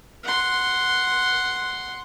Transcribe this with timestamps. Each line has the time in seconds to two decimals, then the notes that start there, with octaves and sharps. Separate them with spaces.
0.24 F#5 C6